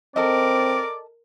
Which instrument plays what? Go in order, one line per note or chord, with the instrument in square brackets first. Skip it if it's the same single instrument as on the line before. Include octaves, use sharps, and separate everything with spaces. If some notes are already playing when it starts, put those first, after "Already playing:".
[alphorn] C4 [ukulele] A4 D#5 [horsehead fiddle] A#4 [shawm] D5